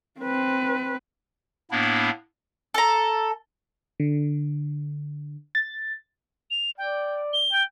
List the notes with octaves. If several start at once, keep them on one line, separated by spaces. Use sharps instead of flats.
C4 B4
A2 A#3 B3 D4 E4
A4 A#5
D3
A6
F7
D5 G5
G7
G5